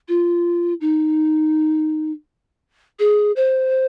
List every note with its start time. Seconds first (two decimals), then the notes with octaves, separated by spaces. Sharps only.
0.08 F4
0.81 D#4
2.99 G#4
3.36 C5